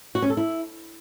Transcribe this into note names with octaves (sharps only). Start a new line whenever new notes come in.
F#4
C#4
A4
E4